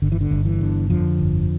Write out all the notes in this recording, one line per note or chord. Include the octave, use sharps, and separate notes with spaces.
G1 D3
E3
D3
G1
E3
D3
F2 D3 F3
G1